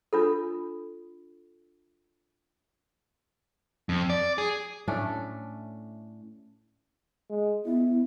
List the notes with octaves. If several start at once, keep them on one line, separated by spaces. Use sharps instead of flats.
D4 F4 A4
F2
D5
G#4
A2 A3 C#4 D4
G#3
B3 E4